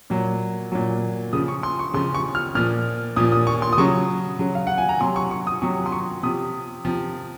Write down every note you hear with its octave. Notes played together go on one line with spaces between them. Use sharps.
A#2 F#3
A#2 F#3
C#3 F3 D#6
C#6
C6
C#6
C#3 F3 C6
C#6
F6
A#2 F3 F6
A#2 F3 D#6
D#6
C#6
C6
D#6
C#3 F#3 C#6
C#3 F#3
F5
F#5
G#5
A#5
C3 F#3 C6
C#6
C#6
D#6
C3 F#3 C#6
C6
C#6
C3 F3 D#6
C3 F3